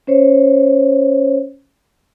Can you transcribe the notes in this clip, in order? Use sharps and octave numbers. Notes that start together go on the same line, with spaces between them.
C#4 C5 C#5